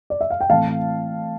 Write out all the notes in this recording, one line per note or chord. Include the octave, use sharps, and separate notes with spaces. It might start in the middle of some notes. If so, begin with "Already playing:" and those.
D5
E5
F5
G5
A2 E3 A3 C4 F5 A5